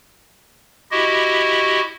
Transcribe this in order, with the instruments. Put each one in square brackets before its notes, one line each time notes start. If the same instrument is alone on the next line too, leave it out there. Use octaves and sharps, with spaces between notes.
[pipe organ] E4 F#4 G4 D#5